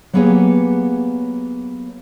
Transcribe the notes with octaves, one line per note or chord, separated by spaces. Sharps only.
F#3 A#3 B3 G4 G#4 C#5